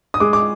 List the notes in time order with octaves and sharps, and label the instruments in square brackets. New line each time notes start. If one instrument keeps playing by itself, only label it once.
[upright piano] D#6
[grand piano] G#3 [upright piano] D6
[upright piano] D6